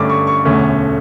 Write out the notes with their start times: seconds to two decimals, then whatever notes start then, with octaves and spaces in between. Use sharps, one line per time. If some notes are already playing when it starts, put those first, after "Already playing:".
Already playing: G2 D3 A3 C#4 D6
0.10 C#6
0.27 C#6
0.45 E1 D2 D3 A3 C#4